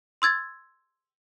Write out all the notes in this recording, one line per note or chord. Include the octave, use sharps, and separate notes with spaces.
C6 E6 G#6 A6